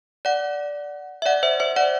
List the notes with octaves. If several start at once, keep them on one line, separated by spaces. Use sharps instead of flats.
D5 F#5
E5
D5 F#5
C5 E5
C5 E5
D5 F#5